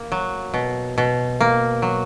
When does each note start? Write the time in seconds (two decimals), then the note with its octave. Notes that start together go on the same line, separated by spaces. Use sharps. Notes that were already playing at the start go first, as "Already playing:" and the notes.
Already playing: A#3
0.12 F#3
0.54 B2
0.98 B2
1.40 A#3
1.82 F#3